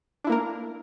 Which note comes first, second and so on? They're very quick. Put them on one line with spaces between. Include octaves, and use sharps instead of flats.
D4 E4 A#3 A#4